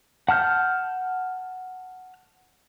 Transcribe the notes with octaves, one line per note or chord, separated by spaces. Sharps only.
F#5 A5 F6 G6